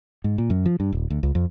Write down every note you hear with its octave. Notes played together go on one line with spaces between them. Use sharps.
G#2
A#2
F#2
F3
G2
D#1
D2
C#2
F2